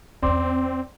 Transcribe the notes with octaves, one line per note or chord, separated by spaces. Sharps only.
E2 C4 C#4 D5 C6 D6